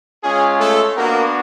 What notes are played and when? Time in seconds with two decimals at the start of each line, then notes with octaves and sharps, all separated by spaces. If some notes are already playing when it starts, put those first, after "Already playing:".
0.23 G#3 C#4 F4 G#4
0.60 A3 A4
0.96 A#3 B3 D4 F#4 A#4